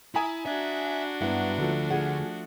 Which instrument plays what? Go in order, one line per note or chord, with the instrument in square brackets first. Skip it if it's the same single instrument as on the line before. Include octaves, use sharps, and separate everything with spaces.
[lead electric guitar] E4 [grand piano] G#5 A#5 D#6
[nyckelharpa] D4 F#4 [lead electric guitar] E5
[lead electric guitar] G2 [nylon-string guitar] F#3 B3 E4 [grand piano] F#5
[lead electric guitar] D2 [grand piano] F3 A3
[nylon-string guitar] F4 G#4 F#5